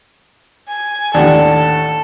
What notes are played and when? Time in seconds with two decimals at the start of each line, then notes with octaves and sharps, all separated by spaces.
0.68 G#5
1.14 D#2 A2 D3 A4 D5 F#5